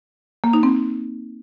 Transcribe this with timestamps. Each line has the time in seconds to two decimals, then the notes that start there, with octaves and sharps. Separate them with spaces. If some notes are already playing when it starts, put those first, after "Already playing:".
0.44 A#3
0.53 D#4
0.63 C4